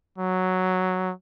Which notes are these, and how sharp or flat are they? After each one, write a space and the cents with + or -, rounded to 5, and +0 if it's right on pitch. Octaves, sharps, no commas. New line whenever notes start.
F#3 +0